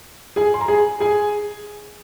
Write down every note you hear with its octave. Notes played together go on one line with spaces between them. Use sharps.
G#4 G#5
C6
A#5
G#4 G#5
G#4 G#5